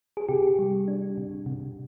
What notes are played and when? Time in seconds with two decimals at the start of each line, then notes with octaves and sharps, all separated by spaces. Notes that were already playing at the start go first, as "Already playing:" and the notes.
0.17 G#4
0.29 C3 G4
0.59 G3
0.88 D4
1.18 C3
1.46 C3